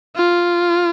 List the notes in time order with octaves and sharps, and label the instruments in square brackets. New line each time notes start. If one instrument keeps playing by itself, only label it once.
[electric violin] F4